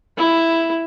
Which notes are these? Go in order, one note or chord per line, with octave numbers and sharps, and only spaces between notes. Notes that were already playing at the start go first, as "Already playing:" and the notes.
E4